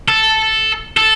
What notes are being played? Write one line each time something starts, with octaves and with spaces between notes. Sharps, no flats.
A4
A4